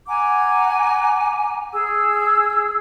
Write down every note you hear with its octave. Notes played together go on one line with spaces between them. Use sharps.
F#5 G#5 A#5 D6
G#4 E6